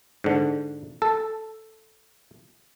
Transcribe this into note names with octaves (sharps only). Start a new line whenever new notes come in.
G#2 D3
A4